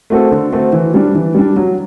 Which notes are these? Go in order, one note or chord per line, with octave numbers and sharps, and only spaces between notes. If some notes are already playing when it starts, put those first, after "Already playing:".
A3 C4 F#4 A4
D3
A3 C4 F#4 A4
E3
G3 D4
E3
G3 D4
F#3